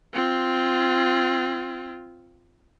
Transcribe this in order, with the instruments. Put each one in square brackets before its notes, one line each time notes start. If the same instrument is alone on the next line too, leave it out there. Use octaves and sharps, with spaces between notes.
[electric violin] C4 F4